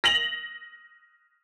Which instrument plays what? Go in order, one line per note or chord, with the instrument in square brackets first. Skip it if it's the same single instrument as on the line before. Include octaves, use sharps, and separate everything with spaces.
[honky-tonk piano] A#6 F7 F#7